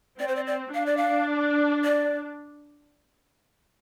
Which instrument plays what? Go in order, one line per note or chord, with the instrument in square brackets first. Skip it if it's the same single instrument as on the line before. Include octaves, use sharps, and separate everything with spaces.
[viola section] C4 [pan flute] D5
[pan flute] C5
D5
D5
[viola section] D4 [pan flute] F5
[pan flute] D5
F5
D5